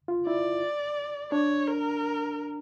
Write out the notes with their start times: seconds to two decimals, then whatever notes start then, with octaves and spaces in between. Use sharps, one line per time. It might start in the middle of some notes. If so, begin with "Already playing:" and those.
0.08 F4
0.27 E4 D5
1.31 D4 C#5
1.67 A#4